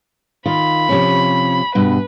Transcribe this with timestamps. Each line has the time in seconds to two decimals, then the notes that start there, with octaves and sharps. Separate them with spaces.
0.46 D#3 F4 B5
0.89 C3 F3 C#4
1.75 G2 B2 B4